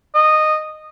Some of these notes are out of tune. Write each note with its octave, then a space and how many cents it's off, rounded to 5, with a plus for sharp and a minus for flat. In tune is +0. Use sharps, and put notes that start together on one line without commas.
D#5 -15